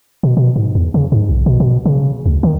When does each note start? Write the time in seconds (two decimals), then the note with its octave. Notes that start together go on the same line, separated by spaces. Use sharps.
0.23 B2
0.37 B2
0.56 G#2
0.75 E2
0.94 C#3
1.12 G#2
1.29 B1
1.46 B2
1.60 B2
1.86 C#3
2.26 D2
2.43 D#3